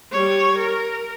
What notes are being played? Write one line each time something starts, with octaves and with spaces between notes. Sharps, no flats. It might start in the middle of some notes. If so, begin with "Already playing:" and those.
G3 C#5
A#4